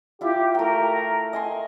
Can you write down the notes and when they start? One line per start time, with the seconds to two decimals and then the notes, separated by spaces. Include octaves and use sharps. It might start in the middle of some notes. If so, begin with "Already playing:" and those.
0.21 E4 F4 G4
0.55 A3 A#4 G5
1.33 D#5 G#5 C6